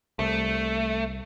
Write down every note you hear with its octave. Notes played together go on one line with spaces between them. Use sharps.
C2 A3